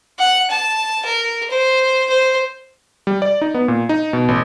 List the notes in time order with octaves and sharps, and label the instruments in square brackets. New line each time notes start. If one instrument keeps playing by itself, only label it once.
[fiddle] F#5
A5
A#4
C5
C5
[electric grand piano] G3
D5
D#4
B3
A#2
D#4
B2
A1